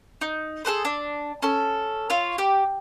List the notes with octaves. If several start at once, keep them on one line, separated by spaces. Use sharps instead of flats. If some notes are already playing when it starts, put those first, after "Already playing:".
D#4
G#4 A4 B4 C5
D4
C#4 A4
F4 C#5
G4